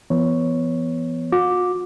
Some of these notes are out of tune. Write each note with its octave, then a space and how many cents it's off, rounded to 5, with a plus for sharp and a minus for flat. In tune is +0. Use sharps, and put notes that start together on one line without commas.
E3 +40 B3 +0 C#5 +0
F#4 -45 D6 +0